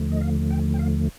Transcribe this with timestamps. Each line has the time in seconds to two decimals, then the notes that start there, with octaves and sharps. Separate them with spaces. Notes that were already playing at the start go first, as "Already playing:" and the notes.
Already playing: D#2 D3 F3 A3
0.11 D#5
0.21 F5
0.51 G5
0.74 G5
0.79 F5